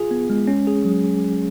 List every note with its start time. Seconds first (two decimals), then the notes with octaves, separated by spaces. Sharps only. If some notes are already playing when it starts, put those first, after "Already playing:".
Already playing: F4 G#4
0.11 B3
0.30 G#3
0.47 C#4
0.67 G#4
0.85 F#3